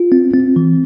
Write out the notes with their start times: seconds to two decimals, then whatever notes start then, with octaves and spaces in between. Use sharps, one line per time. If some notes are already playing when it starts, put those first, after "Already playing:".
Already playing: F4
0.12 C4
0.34 C4
0.56 E3